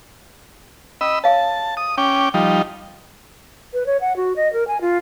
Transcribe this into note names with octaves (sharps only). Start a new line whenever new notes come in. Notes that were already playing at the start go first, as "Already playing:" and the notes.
C#4 D#5 B5 E6
C#5 F5 G#5 A5
D#6
C#4 G5 D6
F3 G3 D#4
B4
C#5
F#5
F#4
D#5
A#4
G#5
F4